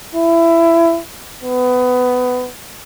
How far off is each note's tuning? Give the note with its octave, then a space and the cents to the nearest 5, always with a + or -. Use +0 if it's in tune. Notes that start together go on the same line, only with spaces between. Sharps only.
E4 +20
B3 +20